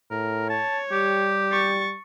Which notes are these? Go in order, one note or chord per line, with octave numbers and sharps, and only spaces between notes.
A2 A#4
C#5 A5
G3 G4
C#6 A6